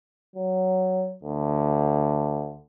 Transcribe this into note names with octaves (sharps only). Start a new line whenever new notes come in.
F#3
D2